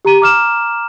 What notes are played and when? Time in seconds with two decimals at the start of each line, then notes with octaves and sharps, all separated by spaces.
0.05 G4 A#5 D#7
0.20 A#5 D6 F6 E7